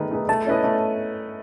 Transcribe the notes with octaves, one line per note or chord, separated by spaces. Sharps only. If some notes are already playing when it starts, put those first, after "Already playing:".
Already playing: D#3 A3 D#4 G#4 B4
A3 D#4 G#4 B4
A3 A5
C#4 E4 B4 D#5
A3